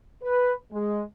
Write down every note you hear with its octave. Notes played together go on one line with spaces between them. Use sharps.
B4
G#3